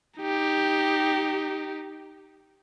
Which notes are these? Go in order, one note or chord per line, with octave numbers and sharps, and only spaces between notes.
D#4 G4